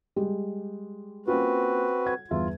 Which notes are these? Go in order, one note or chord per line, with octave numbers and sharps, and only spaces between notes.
G3 G#3 G4
A#3 C4 C#4 F4 F#4 B4
F#5 G#6
G1 E2 F4 E5